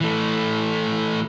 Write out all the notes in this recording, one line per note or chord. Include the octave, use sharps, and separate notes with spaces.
E3 A3